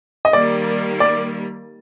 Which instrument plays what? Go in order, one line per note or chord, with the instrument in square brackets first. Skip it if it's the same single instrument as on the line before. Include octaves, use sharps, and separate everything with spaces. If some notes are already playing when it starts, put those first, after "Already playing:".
[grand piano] D#5
[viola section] D#3 G3 A#3 [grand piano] D5
[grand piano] D5